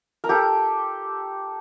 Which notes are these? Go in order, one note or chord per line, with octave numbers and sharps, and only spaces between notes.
A#4
G4 A4